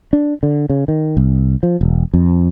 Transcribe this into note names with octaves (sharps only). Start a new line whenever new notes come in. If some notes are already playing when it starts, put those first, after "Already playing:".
D4
D3
C#3
D#3
C2
F3
E1
F2